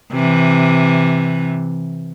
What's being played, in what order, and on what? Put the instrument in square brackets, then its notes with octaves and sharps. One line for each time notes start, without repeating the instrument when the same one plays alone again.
[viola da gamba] C3 E3